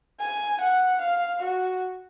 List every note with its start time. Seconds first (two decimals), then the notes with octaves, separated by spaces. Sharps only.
0.20 G#5
0.61 F#5
1.01 F5
1.42 F#4